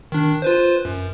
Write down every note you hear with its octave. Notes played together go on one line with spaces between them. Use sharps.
D#3 D4
F4 B4 C5
F#2